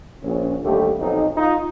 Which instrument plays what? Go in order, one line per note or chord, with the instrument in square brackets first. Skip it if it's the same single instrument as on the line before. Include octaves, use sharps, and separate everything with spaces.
[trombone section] A#1 C#4
D#2 D3 G3 A3 G4
B1 F2 D#4
D#4 F4